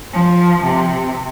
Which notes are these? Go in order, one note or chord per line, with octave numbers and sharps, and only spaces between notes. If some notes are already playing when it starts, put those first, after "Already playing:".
F3
C3